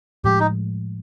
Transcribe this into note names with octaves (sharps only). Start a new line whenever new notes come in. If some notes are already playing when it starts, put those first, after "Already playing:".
A2 F3 G#3 G4
D#4